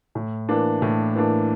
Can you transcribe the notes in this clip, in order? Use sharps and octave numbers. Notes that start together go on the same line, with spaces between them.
A2
E3 A#3 D4
A2
E3 A#3 D4